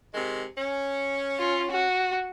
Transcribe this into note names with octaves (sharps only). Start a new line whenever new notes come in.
C3 D#3 G#3
C#4
F4
F#4